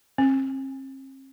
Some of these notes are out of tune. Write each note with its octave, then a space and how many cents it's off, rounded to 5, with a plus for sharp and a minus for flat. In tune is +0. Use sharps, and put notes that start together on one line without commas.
C4 +45